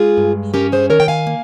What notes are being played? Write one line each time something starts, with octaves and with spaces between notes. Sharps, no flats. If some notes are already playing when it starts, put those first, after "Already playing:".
Already playing: G#3 F4 G#4
G2
C#4 G4 A#4
G#4 C5
D#3 A#4 C#5
G5
F5 G#5
A#3